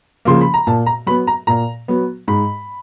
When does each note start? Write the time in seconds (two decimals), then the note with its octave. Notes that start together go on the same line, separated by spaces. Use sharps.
0.25 C#3 F3 A#3 C6
0.41 B5
0.54 A#5
0.67 A#2 A5
0.86 A#5
1.06 F#3 B3 B5
1.27 A#5
1.47 A#2 A#5
1.88 F#3 B3
2.28 G#2 B5